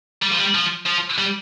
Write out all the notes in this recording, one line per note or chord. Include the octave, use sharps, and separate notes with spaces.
G3
F3
G3
F3
F3
G3